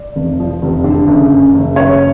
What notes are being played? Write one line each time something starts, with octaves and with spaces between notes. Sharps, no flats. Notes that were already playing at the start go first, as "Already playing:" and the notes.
Already playing: D5
F1
F3
F1
D3
F#1
F#2
F#1
F#1 C#5